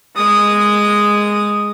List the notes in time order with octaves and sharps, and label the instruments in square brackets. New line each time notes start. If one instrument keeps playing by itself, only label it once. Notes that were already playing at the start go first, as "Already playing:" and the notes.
[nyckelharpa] G#3 D#6